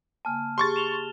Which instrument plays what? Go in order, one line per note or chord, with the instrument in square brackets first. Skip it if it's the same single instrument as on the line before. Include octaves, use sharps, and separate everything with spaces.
[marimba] C#3 A#3 G#5 [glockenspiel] A5 F6
[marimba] G4 G#4 [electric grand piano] C6 C#6 A6
[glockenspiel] E7 F7 G7